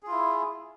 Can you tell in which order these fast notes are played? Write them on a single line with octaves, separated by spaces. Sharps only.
G#4 F4 E4